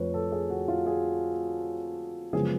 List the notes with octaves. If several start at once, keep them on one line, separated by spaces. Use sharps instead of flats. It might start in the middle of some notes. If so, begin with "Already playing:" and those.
Already playing: F2 F3 A3 B4 C#5
A4
G#4
F#4
F4
G#4
F#2 C#3 F3 G#3 B3 G#4